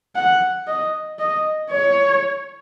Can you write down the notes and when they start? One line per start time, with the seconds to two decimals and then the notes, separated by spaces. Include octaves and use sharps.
0.16 F#5
0.67 D#5
1.19 D#5
1.70 C#5